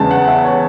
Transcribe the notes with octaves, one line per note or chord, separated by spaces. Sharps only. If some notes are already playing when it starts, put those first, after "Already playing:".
Already playing: E2 C#3 G#3 A5
F#5
E5
C#5